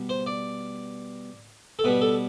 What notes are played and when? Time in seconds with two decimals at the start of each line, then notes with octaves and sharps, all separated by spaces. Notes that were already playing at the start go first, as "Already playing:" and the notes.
Already playing: B2 G3
0.09 C5
0.26 D5
1.79 A4
1.84 B2 G3 B4
2.01 A4